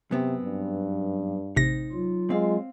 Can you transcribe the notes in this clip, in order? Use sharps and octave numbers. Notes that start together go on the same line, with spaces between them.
F#2 C3 B3 C4
G2
A1 C3 D#4 A#6
F#3 F4
G#3 C4 F5